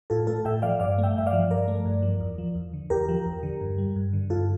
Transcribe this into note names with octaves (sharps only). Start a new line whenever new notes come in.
A2 F4 A4
A3 F4 A4
A2 E5 G5
F3 D5 F5
G2 D5 F5
A3
E5 G5
G2 E5
D5 F5
F3
G2 A#4 D5
A3
G2
F3
E2
F3
E2
D3
E2 G4 A#4
F3
E2
D3
G2
G3
G2
D3
G2 F4 A4